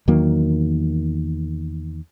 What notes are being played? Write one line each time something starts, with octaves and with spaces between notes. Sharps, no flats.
E2 D#3 F#3 A#3